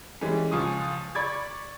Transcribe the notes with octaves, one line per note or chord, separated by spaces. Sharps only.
E3 G3 G#3 C#4
C#2 F3 F4 G#5 C#6 D#6
D5 B5 C#6 D6 G#6 A6